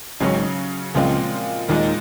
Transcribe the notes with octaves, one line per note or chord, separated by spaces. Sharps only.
G#1 G#2 C#3 F#3 C#4
C#2 A#2 C#3 F3 G#3 C4 F4
D#2 A#2 D#3 G#3 D#4